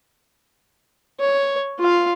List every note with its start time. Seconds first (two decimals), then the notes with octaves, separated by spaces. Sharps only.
1.20 C#5
1.79 F4 F5